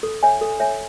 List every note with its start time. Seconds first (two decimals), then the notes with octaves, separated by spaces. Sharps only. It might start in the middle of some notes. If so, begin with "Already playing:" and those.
0.03 A4
0.23 C#5 E5 G#5
0.41 A4
0.60 C#5 E5 G#5